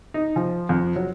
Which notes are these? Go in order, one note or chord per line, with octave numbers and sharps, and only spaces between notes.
D#4
F3
F2
F#3